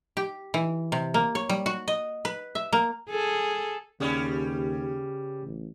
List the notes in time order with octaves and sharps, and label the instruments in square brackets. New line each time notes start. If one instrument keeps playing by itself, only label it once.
[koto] G4
E3
C3
A#3
C#5
G3
F#4
D#5
B4
E5
A#3
[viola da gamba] G#4 A4
[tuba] D#2 [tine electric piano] C#3 [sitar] G3 B3 C#4
[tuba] A1